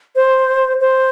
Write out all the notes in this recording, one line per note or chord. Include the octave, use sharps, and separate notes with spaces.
C5
C5